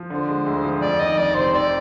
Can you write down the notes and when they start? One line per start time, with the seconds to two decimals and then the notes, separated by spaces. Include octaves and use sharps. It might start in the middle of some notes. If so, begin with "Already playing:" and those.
Already playing: F3
0.10 D3 C5
0.28 G#3
0.46 D2
0.63 F3
0.81 F2 D5
0.99 D#3 D#5
1.17 F1 D5
1.35 C3 C5
1.53 F2 D5